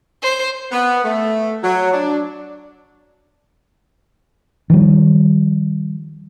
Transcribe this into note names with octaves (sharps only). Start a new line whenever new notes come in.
C5
B3
A3
F#3
D4
D#3 F3 G3